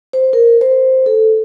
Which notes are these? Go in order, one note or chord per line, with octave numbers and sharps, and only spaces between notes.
C5
A#4
C5
A4